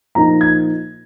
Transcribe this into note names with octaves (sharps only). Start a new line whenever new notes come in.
A#2 F3 A#3 D#4 A#5
G#6